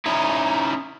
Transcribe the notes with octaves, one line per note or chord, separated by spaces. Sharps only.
C#4 D#4 E4